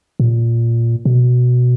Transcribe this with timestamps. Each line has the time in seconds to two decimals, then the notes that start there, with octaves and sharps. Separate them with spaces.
0.20 A#2
1.05 B2